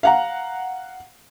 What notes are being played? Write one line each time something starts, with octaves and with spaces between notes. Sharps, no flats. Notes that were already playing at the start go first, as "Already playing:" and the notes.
F5 F#5 A#5